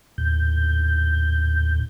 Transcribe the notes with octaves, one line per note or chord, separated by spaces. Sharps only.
D#2 A2 G6